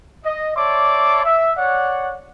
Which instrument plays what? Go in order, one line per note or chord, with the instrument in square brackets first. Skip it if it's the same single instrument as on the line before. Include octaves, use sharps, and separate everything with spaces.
[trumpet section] D#5
C#5 D5 E5 A5 C6 D6
E5
C#5 D5 F#5